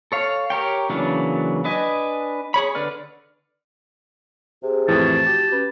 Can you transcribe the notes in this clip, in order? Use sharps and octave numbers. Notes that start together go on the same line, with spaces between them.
A4 C#5 F5
G4 A#4 C#5 G5
C#3 E3 F#3 A#3 D4
D4 B4 D#5 G#5
G#4 C#5 B5
D3 B4 D5 F6
C3 G#4
F2 A2 E3 A5
F#4 G4
C#4 B4